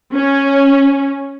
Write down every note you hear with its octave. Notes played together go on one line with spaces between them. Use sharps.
C#4